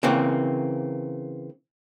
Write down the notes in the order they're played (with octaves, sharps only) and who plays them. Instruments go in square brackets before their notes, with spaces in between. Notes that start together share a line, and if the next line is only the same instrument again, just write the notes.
[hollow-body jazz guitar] C#3 E3 A#3 C4